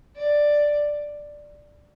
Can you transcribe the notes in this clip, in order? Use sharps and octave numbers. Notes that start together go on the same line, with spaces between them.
D5